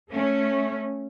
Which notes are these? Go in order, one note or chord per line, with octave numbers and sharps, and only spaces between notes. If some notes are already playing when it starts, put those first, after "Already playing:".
A3 C#4